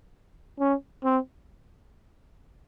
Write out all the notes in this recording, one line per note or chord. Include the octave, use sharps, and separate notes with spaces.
C#4
C4